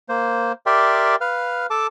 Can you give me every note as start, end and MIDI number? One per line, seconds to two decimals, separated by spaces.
0.09 0.52 58
0.09 0.52 72
0.66 1.16 67
0.66 1.16 70
0.66 1.16 74
0.66 1.16 76
0.66 1.16 79
0.66 1.16 84
1.21 1.66 71
1.21 1.66 77
1.21 1.66 89
1.70 1.87 69
1.70 1.87 81
1.70 1.87 86